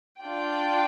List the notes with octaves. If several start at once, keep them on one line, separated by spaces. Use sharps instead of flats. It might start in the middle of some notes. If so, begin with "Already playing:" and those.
D4 F4 D5 G5